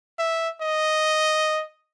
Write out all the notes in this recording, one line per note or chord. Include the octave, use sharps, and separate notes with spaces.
E5
D#5